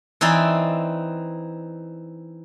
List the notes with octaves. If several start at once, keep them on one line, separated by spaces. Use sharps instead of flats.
E3 C4 D#4 E4 D5 C6